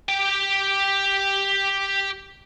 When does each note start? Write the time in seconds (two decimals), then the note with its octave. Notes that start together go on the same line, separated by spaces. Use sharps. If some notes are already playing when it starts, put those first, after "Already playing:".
0.09 G4 G5